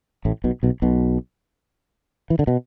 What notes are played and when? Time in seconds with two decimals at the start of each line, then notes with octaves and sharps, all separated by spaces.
0.25 A1 A2
0.44 B1 B2
0.63 B1 B2
0.82 B1 B2
2.30 E3
2.39 D3
2.47 B2